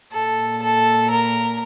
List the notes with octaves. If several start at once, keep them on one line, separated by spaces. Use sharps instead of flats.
A#2 A4
A4
A#4